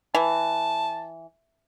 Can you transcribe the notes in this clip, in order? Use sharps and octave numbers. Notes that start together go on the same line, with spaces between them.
E3 A5